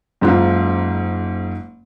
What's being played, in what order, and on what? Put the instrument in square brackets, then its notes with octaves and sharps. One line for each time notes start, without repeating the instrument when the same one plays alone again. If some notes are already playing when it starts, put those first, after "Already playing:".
[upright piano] F#1 G#2 F4